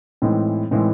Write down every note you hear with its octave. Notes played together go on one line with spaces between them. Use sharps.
A2 E3 G#3 C4 D#4
A2 E3 G#3 C4 D#4